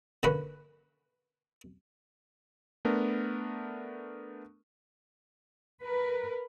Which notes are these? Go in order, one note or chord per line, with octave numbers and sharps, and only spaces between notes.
D3 A#3 C#4 B4
A3 B3 D4 A#4
A#4 B4